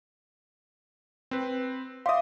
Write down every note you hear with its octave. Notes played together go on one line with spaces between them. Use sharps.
C4 B4
E5 F5 C6 D6 D#6